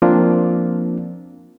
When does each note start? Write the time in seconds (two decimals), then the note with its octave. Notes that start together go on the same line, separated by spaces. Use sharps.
0.02 F3 A#3 C4 D4 F4